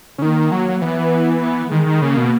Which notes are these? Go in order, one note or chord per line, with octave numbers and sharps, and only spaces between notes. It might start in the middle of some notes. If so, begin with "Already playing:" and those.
C#3
D#3 A#3
F#3
E3 B3
B3
D#3 G#3
D#3
C#3 A#3
B2